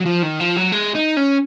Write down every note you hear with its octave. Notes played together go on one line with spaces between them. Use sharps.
F#3
F3
D#3
F3
F#3
G#3
D#4
C#4